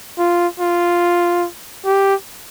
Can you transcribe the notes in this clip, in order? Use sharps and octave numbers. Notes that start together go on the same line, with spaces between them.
F4
F4
G4